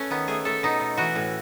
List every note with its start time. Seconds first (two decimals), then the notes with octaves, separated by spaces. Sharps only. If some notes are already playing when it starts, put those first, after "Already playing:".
Already playing: A3 C#4 B4
0.10 D#3 B3
0.28 A3 G#4
0.45 A3 A4
0.63 B2 D#4
0.80 B2
0.97 E3 F#4
1.15 A2